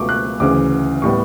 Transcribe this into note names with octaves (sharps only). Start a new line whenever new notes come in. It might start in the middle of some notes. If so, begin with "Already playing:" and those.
Already playing: C#2 B2 A3 C#6 D6
F#6
D2 C#3 E3 D6
A2 G3 B3 C#6